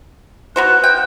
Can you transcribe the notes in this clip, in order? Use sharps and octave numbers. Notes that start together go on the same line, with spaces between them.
B3 F#4 C5 F#6
G5